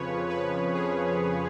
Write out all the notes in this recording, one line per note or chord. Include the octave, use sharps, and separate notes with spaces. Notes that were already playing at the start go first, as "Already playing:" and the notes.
Already playing: F2 C#3 F3 B4 C#5
B4
G#4